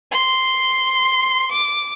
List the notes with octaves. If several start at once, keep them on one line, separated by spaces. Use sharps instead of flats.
C6
D6